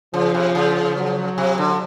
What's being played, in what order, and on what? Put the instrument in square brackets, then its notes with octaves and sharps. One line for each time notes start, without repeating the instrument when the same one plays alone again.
[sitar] C#3 [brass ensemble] F3
[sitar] C3
C#3
[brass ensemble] F#3
[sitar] C3
D3